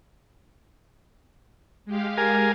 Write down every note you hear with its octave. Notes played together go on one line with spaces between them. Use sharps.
G#3 G4 F5
A#4 G#5